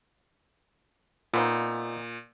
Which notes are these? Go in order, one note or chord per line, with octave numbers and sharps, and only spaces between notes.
A#2 B3 C4 D#4 F4